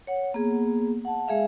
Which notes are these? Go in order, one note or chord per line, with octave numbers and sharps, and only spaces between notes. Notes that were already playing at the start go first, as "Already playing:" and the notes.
C#5 F#5
A#3 B3 G#4
F#5 A5
G#3 G#4 E5 F5